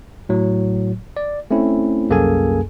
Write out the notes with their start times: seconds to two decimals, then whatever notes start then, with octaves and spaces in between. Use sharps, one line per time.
0.29 A2 F#3
1.17 D5
1.51 A3 C4 C#4 E4
2.09 C2 F#2 A#3 G#4 A4 G#5